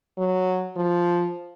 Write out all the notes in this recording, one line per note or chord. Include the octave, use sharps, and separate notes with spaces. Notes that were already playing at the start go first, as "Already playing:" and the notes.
F#3
F3